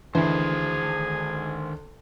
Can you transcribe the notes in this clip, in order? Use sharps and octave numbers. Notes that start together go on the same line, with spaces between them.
D2 D#3 E3 G#4 C5